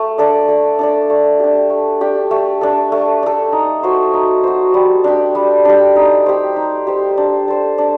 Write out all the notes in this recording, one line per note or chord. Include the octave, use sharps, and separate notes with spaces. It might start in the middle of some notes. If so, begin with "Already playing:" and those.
Already playing: A3
D4 A4 D5
A3
D4 A4 D5
A3
D4 G4
A3
D4 G4
A3
D4 A4
A3
D4 A4
D#4
F#4 C5
D#4
F#4 C5
G3
D4 G4
G3
D4 G4
D#4
G4 C5
D#4
G4 C5
D4
A4 C5
D4